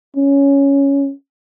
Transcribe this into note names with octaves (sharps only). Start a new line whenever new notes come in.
C#4